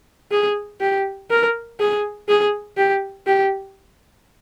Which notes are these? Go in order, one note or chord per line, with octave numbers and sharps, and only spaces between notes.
G#4
G4
A#4
G#4
G#4
G4
G4